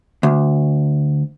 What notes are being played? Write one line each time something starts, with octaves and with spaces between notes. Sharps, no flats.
D2